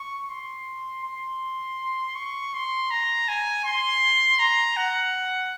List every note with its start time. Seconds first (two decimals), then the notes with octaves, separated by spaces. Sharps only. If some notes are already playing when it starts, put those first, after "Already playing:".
Already playing: C#6
0.30 C6
1.05 C6
2.15 C#6
2.54 C6
2.91 A#5
3.28 G#5
3.65 C6
4.39 A#5
4.77 F#5